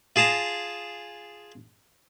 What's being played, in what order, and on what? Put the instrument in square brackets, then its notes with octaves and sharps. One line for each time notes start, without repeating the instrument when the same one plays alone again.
[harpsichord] F4 G#4 A5 A#5